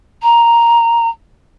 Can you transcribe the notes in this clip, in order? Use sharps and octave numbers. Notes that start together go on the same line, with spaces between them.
A#5